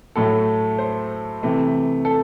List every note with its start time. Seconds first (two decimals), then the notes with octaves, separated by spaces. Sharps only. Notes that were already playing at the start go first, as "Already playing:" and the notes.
0.16 A2 F#3 A3 A4
0.78 C5
1.43 C3 E3 A3
2.05 A4